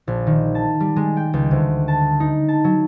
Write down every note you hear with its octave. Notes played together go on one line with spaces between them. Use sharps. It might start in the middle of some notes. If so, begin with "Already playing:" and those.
A#1
D#3
A5
G3
G#3
G5
C#2
D2
A5
D#4
A5
F#3